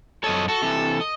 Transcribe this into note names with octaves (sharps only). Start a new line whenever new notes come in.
F#2 A4 C#5 D#5
F#4 A4
C3 E3
D#5